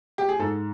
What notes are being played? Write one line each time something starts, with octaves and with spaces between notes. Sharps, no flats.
G4
G#4
G#2 A4